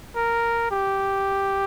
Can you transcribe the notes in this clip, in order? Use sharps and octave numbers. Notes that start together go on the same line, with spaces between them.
A#4
G4